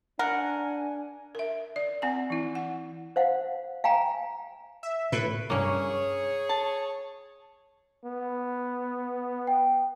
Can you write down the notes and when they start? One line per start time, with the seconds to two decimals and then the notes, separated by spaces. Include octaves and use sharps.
0.19 D4 A#4 F#5 G#5
1.35 A#4 E5
1.76 D5
2.02 C4 F#5 G#5
2.30 E3 E4
2.55 F#5
3.16 C5 F5 F#5
3.84 F5 G5 G#5 A#5
4.83 E5
5.12 A2 B4
5.50 C2 G2 A#3 C#4 G#4 C#5
6.49 A5
8.05 B3
9.47 G5